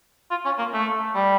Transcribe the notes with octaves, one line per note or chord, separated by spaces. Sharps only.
F4
C#4
A#3
A3
G3